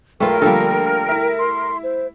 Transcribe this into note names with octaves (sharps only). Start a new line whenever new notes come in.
B1 G#3 A3 F4 A#4 B4 G5
D3 F3 G3 A#3 A4 G5
E4 E5
C6
C5